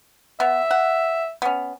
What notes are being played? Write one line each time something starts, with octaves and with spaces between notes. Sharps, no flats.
B3 E5
F#5
B3 C#4